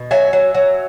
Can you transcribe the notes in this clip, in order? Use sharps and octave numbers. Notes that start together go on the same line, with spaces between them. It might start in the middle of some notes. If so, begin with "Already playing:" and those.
Already playing: B2
F#3 E5 G#5
F#3
F#3